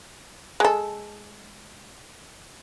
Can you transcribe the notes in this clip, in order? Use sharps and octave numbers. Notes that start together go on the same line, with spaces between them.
G#3 A4